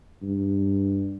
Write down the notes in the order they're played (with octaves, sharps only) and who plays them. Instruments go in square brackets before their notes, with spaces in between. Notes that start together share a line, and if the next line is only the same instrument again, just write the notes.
[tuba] G2